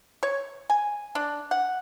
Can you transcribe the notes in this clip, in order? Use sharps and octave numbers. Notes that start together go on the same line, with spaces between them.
C#5
G#5
D4
F#5